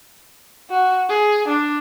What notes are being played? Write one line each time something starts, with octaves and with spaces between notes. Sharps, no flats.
F#4
G#4
D4